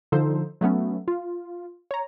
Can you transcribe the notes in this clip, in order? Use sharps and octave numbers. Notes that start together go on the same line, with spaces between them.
D3 F3 D#4 A4 C5
F#3 A3 B3 C#4
F4
C#5 A#5